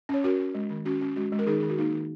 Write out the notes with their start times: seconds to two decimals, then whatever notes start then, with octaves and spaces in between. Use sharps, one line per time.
0.09 C#4 C#5
0.24 C#4 F#4 A#4
0.40 C#4
0.55 G#3
0.70 D#3
0.85 C#4 F#4
1.02 C#4
1.16 G#3 F#4
1.32 G#3
1.39 A#4
1.47 D#3 D#4 G#4
1.60 D#3 G#4
1.69 F#4
1.78 A#3 D#4
1.94 D#3